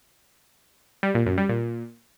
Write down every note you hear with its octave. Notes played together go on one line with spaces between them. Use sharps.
G3
A#2
F#2
G3
A#2